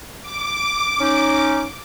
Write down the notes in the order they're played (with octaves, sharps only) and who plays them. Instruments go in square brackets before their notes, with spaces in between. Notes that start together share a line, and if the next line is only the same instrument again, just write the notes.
[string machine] D6
[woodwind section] C#4 D#4